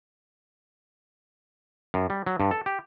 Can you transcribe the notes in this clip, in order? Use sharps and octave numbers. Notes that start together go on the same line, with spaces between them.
F#2
G3
F#3
G2
A4
G4